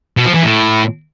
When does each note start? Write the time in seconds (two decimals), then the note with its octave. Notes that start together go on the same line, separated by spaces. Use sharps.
0.17 B2
0.26 F3
0.34 E3
0.43 A2